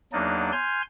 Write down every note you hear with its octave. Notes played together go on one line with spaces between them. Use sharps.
E2 F#3 A#3 D4 D#4 D5
G#5 C6 F6 G6